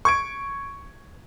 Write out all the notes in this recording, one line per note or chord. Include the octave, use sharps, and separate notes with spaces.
C#6 G#6 D7